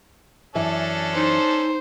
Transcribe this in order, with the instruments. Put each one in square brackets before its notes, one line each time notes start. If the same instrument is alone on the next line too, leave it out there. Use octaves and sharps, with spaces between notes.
[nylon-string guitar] F#2 E3 E5 [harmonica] C#4 D4 A4
[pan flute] D#4 [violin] C5